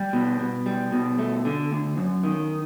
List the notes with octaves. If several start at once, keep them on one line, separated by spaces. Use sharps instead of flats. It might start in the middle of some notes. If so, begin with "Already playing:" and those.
Already playing: G3
B2
B2
G3
B2
A3
D3
D2
F#2
D#3